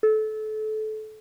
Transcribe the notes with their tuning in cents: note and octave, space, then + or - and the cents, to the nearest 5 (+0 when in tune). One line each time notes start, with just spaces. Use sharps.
A4 -25